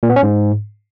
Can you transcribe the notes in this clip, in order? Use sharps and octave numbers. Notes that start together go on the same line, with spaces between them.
A#2
B3
C#4
G#2